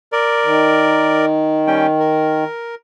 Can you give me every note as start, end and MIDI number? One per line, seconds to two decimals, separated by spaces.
0.12 1.26 70
0.12 1.26 74
0.44 2.44 51
1.67 1.87 55
1.67 1.87 61
1.67 1.87 79
1.99 2.75 70